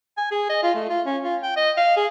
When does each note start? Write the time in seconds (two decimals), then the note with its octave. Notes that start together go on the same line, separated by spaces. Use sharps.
0.17 G#5
0.31 G#4
0.49 D#5
0.63 F4
0.75 A3
0.89 F4
1.06 C#4
1.23 F4
1.43 G5
1.56 D#5
1.77 F5
1.97 G#4